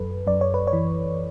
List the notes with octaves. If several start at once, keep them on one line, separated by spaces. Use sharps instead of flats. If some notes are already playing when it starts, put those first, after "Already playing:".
Already playing: F#2 A4 B4
F#2 D5
C#5
B4
C#5
E3